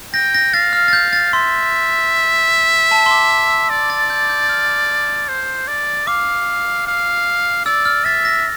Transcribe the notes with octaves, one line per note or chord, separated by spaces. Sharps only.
G5 A#6
A#6
F5 A6
F6
A6
G6
A6
E5 C6
A5
C6
D6
E6
E6
D5 E6
A6
G6
G6
G6
F6
C5
D5
F5 D6
F5
D5 E6
F6
E5 A6
A#6